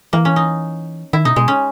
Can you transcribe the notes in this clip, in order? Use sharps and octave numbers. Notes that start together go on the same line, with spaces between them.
E3 A#3
C#4
D#4
D#3 E4
B2 D#4
B2 G#3
C#4